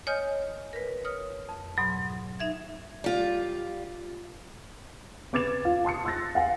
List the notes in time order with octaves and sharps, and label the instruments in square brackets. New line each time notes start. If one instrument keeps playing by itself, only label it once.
[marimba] C#5 D#5 G#5 D#6 F6 G6
A#4 B4
C#5 D#6 F6
F2
G#2 B2 F#3 B5
D#4 E5 G#6
[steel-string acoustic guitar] G3 F4
[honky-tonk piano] B3 D6 G#6 A6 E7
F4
A5 C6 D#6 C#7
C6 E6 F#6 A6 A#6
F5 F#5 G#5